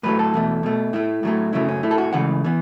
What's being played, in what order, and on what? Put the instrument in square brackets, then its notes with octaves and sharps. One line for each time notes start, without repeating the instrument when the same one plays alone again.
[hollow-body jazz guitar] A2 F#3 A3 B4
A4
E2 B2 A3
B2 A3
A2 A3 E4
A2 F#3 A3
F#2 C#3 F#3 A3 E4
C#4
A2 A3 E4
A4
F#4
C#2 C#3 E3 A3 F#5
E3 B3